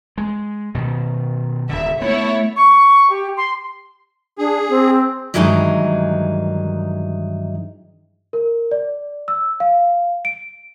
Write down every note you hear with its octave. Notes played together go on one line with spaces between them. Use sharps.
G#3
B2 D#3
D#1 D3 E5
A3 B3 E4 C#5
C#6
G4
C6
D4 G#4
C4
G2 D#3 E3 F#3 G#3 D#4
A#4
D5
E6
F5
D7